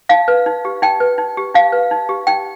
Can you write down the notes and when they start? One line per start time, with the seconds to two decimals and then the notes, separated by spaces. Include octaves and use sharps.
0.09 D#4 F5
0.28 B4
0.46 D#4
0.65 G4
0.82 D#4 G5
1.00 B4
1.18 D#4
1.37 G4
1.54 D#4 F5
1.72 B4
1.91 D#4
2.09 G4
2.27 D#4 G5